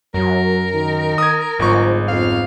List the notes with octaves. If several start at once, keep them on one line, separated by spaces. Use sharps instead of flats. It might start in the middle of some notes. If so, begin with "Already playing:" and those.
F#2 F#3 A#4
D#3
D#6 G#6
G1 G#2 F3 C#6
F2 F5